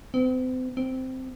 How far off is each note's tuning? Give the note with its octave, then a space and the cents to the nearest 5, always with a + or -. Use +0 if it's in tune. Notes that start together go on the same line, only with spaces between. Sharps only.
C4 -40
C4 -10